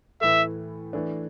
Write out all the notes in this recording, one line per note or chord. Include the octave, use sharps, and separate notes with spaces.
A2 E3 A3 E5
E3 A3 D4